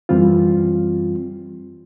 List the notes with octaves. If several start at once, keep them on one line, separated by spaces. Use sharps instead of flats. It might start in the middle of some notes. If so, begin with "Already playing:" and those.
F#2 E3 G3 C4 F4